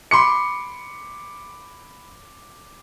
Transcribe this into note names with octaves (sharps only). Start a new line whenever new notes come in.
B5 C6 D6 C#7